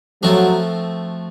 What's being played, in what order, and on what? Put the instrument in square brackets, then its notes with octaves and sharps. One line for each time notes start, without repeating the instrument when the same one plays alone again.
[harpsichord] F3 A3 C4 F#4 [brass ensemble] F#3